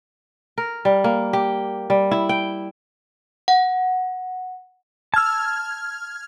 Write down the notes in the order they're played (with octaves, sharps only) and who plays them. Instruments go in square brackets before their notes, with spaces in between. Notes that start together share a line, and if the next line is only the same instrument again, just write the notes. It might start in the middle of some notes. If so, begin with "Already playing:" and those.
[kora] A#4
G3
A#3
G4
G3
E4
G5
[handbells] F#5
[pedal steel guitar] A5 E6 [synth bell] F6 G#6